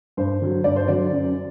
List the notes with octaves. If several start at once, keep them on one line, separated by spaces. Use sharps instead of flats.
G2 C5
D3 F#3
G2 D5
C5
D3 F#3 D5
F#2